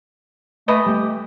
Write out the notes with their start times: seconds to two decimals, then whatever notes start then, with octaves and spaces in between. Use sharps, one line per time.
0.68 E3 A3 B4 D#5
0.86 G3 A3 G4